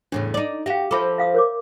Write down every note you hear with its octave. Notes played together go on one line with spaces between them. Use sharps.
E2 A2 C#3 D4
D#4 D5
F#4 G4 E5 F5
F3 A4 E5 B5 D6
E5 F5 D#6
A#4 C#5 D6